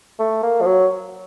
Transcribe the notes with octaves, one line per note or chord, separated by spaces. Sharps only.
A3
A#3
F3
F#3